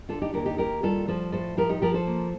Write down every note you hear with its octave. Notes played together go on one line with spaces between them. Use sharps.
D3 F4 A4
D#4 G4
D#2 G4 A#4
D#4 G4
D#2 G4 A#4
G3 F4 A4
F3 A4 C5
A2 A4 C5
F3 G4 A#4
D#4 G4
F3 G4 A#4
A4 C5
A#3